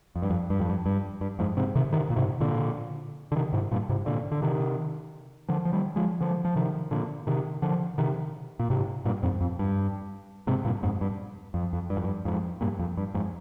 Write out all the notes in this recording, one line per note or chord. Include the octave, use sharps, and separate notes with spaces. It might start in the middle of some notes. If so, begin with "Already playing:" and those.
F2
G2
F2
G2
F2
G2
G2
G2
F2 G#2
G#2 C3
C3 D#3
C3 D#3
A#2
G#2 C3
A#2 D3
D3
C3 D#3
G#2 C3
G2 A#2
G#2 C3
A#2 D3
D3
C3 D#3
D3 F3
F3
D#3 G3
F3 G#3
D3 F3
F3
C3 D#3
A#2 D3
C3 D#3
D3 F3
C3 D#3
A#2
G#2 C3
G2 A#2
F2 G#2
F2
G2
G#2 C3
G2 A#2
F2 G#2
G2
F2
F2
G2
F2
G2
F2 G#2
G2 A#2
F2
G2
F2 G#2